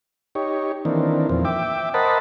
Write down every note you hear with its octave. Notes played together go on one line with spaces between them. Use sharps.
D#4 G4 C#5
D#3 E3 A#3 C4 D4
E2 A#2 F3 C4
E5 G5 D6
A#4 C5 D#5 F#5 A5 B5